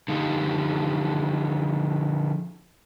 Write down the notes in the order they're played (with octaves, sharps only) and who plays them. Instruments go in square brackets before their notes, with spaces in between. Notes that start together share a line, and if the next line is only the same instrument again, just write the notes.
[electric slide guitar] D3 F3 D#4 G4